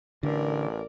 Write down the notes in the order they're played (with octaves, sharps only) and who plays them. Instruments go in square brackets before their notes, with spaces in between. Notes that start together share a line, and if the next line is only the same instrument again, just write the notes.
[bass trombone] A1 [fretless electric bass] D3 [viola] A#4 D5